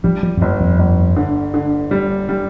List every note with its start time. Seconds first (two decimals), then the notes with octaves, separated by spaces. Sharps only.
0.04 F3 G3
0.23 F3
0.37 F2
0.41 G1 G2
0.60 F2
0.79 G1
1.16 D3
1.54 D3
1.91 G3
2.29 G3